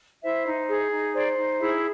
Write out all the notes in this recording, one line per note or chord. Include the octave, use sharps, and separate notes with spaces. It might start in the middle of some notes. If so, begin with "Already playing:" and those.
E4 C5 E5
D#4
G#4
D#4
C5 D5
D#4
E4 G#4 E5